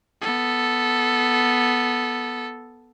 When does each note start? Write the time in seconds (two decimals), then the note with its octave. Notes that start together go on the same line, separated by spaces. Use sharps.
0.21 B3 A4